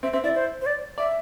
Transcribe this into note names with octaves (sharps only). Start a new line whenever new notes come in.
C4 E5
C4 E5
E4 D5
C5
C5
D5
D5 E5